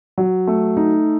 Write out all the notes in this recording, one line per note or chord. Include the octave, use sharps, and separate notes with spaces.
F#3
A3
D#4